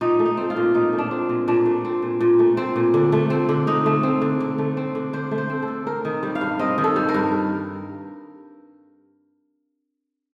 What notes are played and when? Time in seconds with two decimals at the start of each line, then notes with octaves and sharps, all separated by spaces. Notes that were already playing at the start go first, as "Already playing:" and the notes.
0.01 A#2 D#4
0.19 A3
0.26 D#4
0.37 C4
0.50 F4
0.56 A#2
0.75 A#2 D#4
0.93 A3
0.98 D4
1.11 C4
1.29 A#2
1.48 A#2 D4
1.66 A3
1.85 C4
2.02 A#2
2.21 A#2
2.39 A3
2.57 C4
2.76 A#2
2.94 D3
3.12 A3
3.30 C4
3.49 D3
3.67 D3 D#4
3.86 A3
4.03 C4
4.22 D3
4.40 D3
4.58 A3
4.77 C4
4.95 D3
5.13 D3 C5
5.31 A3
5.38 C5
5.50 C4
5.62 A4
5.68 D3
5.86 C4 A#4
6.05 D#3
6.23 G3
6.35 F5
6.41 G2
6.59 C4 D#5
6.78 D#3
6.84 A4
6.96 G3
7.09 A#4
7.14 G2